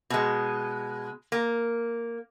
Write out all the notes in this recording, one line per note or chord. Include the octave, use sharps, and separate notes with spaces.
B2 G#3
A#3